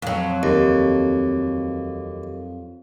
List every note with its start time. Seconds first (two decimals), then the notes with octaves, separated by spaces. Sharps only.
0.02 F2 F#3
0.43 D#2